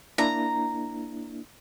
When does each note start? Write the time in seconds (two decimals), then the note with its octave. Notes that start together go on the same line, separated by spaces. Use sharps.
0.18 A#3 D4 E4 A#5